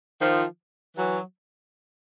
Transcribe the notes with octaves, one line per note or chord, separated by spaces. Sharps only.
D#3 F3
E3 F#3